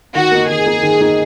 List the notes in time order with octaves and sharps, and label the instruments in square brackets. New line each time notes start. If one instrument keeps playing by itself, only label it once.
[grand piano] D#3 [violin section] F#4
[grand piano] A#3 D#4
[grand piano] D#3 [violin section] G#4
[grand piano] A#3 D#4
D#3
A#3 D#4